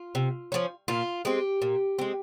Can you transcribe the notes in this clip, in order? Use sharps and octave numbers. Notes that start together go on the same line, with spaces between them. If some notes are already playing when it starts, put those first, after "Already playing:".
Already playing: F4
C3
F3 A#3 C#4
A#2 F4
G#3 C4 G4
A#2
G#3 C4